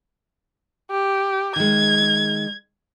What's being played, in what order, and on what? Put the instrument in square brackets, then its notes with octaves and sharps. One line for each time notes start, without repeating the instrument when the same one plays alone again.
[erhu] G4
[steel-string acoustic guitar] D#3 G#3 [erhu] G#6